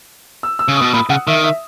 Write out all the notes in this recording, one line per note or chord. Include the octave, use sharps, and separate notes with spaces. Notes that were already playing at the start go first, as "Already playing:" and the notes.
E6
E6
C#3
D#6
B2
A#2 B5
C#3 F#5
D#3 E5
E5